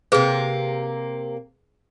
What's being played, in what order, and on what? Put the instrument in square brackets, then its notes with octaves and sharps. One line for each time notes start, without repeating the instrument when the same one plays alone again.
[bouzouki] C3 A#3 [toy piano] G#4 B4